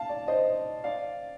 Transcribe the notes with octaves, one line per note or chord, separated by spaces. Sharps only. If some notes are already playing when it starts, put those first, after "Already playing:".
Already playing: F5 A5
D5
C5 D#5
D5 F5